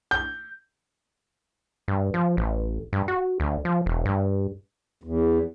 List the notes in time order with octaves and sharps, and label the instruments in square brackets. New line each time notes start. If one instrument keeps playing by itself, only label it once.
[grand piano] G6
[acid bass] G2
F3
A1
G2
F#4
D2
F3
E1
G2
[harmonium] E2